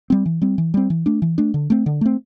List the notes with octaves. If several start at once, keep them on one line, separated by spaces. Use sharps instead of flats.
G3 C4
E3
G3 C4
E3
G3 C4
E3
A3 D4
E3
A3 D4
D3
A3 C4
D3
A3 C4